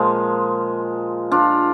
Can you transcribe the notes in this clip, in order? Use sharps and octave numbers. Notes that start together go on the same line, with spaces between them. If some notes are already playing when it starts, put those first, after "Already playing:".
Already playing: A#2 F3 G#3
D4 F4